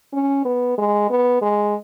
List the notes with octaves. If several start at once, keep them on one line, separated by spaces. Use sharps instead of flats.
C#4
B3
G#3
B3
G#3